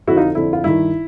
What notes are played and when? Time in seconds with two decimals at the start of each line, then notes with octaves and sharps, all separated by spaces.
0.07 F2 D3 E4 F#4
0.17 D#4 F4
0.35 F2 D3 E4
0.53 F4
0.64 G2 D#3 E4